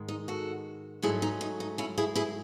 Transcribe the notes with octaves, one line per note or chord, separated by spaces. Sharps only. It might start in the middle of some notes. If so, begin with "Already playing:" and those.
Already playing: G#2 D#3 G#3
D#4
F#4 A4
G#2 F#3 A3 C#4 E4 G#4
D#4
D#4
D#4
C#4 E4
E4 G#4
E4 G#4